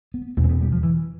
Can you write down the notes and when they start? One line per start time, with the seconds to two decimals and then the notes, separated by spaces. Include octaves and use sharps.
0.14 B3
0.37 E2 B2 A3
0.44 C4
0.49 B3
0.61 G3
0.72 F3
0.83 E3